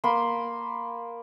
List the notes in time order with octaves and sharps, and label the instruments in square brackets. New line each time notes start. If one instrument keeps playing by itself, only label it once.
[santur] A#3 B5 C6